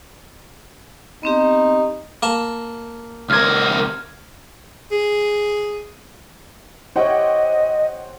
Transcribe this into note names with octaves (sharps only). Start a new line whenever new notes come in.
B3 C4 D#4 G4
A#3 A5
C#2 A#4 F6 G#6
G#4
E4 G4 C5 C#5 D#5 F#5 G5